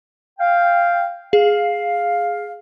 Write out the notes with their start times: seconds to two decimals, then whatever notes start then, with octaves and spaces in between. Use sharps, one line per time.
0.39 F5 G5
1.33 G#4 F5